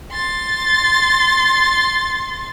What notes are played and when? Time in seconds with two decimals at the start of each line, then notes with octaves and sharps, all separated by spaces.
0.11 C6 A6